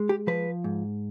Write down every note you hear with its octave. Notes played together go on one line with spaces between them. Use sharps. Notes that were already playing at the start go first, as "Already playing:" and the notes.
Already playing: G#3
G4
F3 B4
G#2